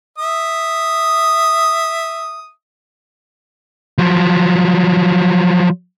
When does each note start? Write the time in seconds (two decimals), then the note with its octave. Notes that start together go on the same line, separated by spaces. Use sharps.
0.18 E5 D#6
3.98 F3 F#3